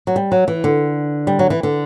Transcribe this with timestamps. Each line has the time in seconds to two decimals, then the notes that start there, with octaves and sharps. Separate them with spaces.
0.07 F#3
0.16 G3
0.32 F#3
0.48 E3
0.64 D3
1.27 G3
1.39 F#3
1.50 E3
1.63 D3